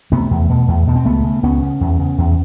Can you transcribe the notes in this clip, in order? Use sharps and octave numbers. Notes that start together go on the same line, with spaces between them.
C3 A3 B3
E2
B2
E2
B2
C4
C#2 A3 B3
C#3
C#2 B3 C#4
C#3
E2
C#3
E2